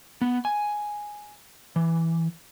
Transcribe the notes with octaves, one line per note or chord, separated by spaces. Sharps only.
B3
G#5
E3